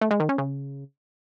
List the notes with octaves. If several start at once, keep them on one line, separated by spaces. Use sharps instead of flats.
A3
G#3
D#3
C#4
C#3